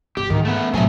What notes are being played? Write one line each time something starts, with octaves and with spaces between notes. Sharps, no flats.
G1 G4
G#2 D#3
A3 B3
A2 C3 F#3 A3 G#5